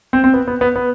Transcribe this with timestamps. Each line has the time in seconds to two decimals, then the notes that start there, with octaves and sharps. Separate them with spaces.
0.13 C4
0.24 C4
0.34 B3
0.47 B3
0.61 B3
0.76 B3